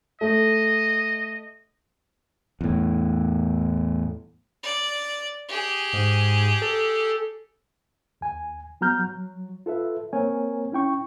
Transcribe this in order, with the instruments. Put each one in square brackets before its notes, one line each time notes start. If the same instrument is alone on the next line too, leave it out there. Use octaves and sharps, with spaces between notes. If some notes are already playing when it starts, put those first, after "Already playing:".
[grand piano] A3 [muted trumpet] D#5
[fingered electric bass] E2 A2
[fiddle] D5
G4 G#4
[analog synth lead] G#2
A4
[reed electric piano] D#2 G#5
F#3 B3 F#4 A#5 F6 G6
F#3
F4 A4 B4 E5
A#3 C4 A#4 C#5 G#5
C#4 E4 G5 C#6